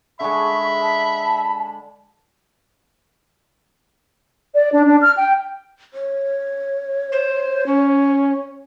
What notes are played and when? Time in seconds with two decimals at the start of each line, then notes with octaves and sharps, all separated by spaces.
0.20 D3 G#3 E5 B5 C#6
0.82 A5
4.55 D5
4.72 D4
4.86 D4
5.01 F6
5.16 G5
5.94 C#5
7.12 C5
7.66 C#4